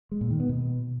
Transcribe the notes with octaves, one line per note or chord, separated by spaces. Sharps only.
G#3
A#2
D#3
B3
B2